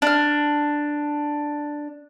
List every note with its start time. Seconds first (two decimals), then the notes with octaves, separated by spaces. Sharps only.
0.02 D4 F6